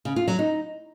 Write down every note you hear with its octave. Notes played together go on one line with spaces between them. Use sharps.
C#3
F4
F#3
D#4